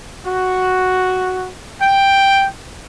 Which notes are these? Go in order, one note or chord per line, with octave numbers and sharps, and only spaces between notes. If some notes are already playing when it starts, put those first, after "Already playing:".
F#4
G5